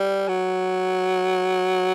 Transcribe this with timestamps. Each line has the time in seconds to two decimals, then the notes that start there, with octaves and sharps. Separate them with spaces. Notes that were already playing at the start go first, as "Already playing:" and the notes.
Already playing: G3
0.29 F#3